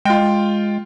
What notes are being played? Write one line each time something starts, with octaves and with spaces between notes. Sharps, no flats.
G#3 F4 G5